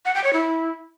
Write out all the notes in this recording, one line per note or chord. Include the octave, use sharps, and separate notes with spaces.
F#5
G5
C#5
E4